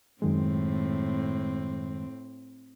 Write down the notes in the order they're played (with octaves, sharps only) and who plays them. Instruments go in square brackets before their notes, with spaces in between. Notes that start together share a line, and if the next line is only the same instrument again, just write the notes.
[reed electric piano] F#2 D#3 G#3 [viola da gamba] A2 C4